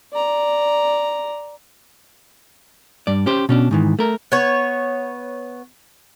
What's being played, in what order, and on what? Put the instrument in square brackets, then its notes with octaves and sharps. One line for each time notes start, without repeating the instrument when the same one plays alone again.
[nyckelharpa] D5 A#5
[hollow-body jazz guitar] G2 D5
C#4 G4 C5
B2 C#4 D4
G#2 D#3 E3
A3 A#4
[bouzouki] B3 C#5